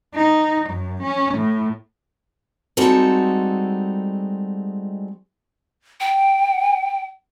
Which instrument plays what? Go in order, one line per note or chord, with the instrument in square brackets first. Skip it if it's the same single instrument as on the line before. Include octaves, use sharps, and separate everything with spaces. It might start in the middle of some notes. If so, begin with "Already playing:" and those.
[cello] D#4
F#2
C#4
A2
[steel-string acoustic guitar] G3 G#3 C4 D#4 F#4 A4
[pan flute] G5